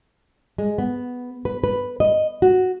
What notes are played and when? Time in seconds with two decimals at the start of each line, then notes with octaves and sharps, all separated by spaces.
0.58 G#3
0.78 B3
1.45 B4
1.64 B4
2.00 D#5
2.42 F#4